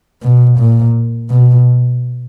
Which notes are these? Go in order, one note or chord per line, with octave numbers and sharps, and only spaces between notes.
B2
A#2
B2